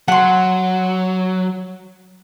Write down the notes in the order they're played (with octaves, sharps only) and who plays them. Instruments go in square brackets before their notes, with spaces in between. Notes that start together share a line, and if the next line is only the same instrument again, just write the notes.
[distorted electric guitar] F#3 [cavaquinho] F#5 C6